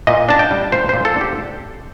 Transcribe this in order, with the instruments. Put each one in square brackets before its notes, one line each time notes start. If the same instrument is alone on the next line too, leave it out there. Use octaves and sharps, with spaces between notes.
[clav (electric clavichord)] A#2 D#5
D4 A5
G5
G3
A#2 C5
A#2 C5
A4
D4
G4